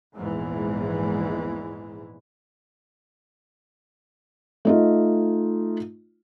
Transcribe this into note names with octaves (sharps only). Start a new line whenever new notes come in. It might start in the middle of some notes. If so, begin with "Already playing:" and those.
A#1 E2 G#2 E3 G#3
A3 D#4 F4